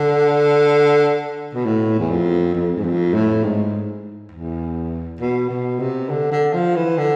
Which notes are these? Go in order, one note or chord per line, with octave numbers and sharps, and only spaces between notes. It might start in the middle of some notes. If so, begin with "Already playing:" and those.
Already playing: D3
B2
A2
E2
F2
F2
G#2
F2
A2
G#2
E2
B2
B2
C3
D3
D3
F3
E3
D3